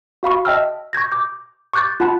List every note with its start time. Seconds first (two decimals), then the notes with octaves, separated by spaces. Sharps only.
0.23 F#4 F5 B5 C#6
0.45 D#5 E5 G5 A5 E6 F6
0.93 C#6 G6 G#6 A#6
1.12 D6 G6
1.73 C#6 D6 F#6 G6 A6
2.00 F4 F#5 A5 B5 F#6